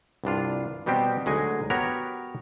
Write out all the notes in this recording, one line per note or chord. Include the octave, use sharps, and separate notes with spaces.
C2 G2 D4 F4
B2 G3 B3 C4 G4
D2 F#3 G#3 D#4 G#5
B3 F#4 G4 A#4 C#5 A#5